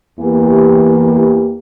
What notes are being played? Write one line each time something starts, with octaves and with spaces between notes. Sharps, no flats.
E2 E3 A#3 E4 G4